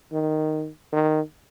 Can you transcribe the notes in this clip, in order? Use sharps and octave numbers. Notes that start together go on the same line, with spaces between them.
D#3
D#3